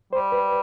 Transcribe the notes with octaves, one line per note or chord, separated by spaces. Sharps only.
G3 C5
B4